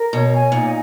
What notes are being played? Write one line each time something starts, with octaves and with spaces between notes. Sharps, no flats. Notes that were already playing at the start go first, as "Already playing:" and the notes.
Already playing: A#4
B2 C#5
G#5
A#2 D#4